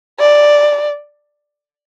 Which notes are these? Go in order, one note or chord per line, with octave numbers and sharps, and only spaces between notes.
D5